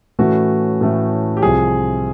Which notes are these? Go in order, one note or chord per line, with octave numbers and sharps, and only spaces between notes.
A2 E3 A3 C#4 F#4
A2 E3 A3 C#4
G4
C2 C3 F3 G#4